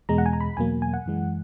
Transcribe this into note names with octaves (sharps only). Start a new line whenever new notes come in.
E2 B2 G#3 A#5
F#5
G#5
A#5
B5
E2 B2 F#3 A#3 G#5
G#5
F#5
F#2 E3 G#3